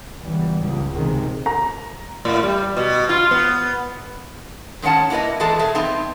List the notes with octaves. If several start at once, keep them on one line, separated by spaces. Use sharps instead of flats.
C#2 E3 G3 B3
C#2 G#2
C#2 C3 D#3 G#3
A#5
A2
G3
B2
F4
B3
G#2 D#3 C#4 F#5 A5
A#3 E4 F4 B4 D#5
E2 G#3 A3 G#4 A4 A5
B2 G#4 E5
B3 C4 D#4